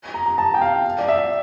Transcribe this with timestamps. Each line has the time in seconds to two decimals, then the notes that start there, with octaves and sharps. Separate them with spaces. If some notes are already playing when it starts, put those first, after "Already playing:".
0.14 A#5
0.26 A#5
0.38 A5
0.54 G5
0.61 F5
0.99 D5
1.08 E5